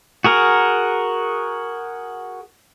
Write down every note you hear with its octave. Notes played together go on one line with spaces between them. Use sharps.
F#4 G#4 A#4